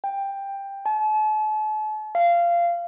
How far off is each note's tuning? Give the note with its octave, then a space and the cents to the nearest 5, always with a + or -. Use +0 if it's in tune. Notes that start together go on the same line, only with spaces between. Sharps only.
G5 +15
A5 -40
F5 -20